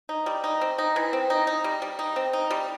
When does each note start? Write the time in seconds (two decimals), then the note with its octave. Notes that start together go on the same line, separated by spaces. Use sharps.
0.09 D#4
0.26 G3
0.44 D#4
0.61 C4
0.78 D#4
0.96 E3
1.13 C4
1.30 D#4
1.47 D#4
1.64 G3
1.82 G3
1.99 D#4
2.16 C4
2.33 D#4
2.51 G3